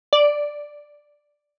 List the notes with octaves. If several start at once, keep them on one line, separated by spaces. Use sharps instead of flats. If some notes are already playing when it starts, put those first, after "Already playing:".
D5